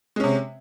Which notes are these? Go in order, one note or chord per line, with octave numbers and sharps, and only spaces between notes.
C3 G#3 C#4